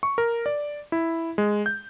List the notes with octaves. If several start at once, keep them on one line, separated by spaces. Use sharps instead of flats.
C#6
A#4
D5
E4
G#3
G6